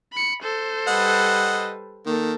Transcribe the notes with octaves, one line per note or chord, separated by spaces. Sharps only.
B5 C#7
A4 C5
G3 B4 D#5 F#5
D#3 A#3 A4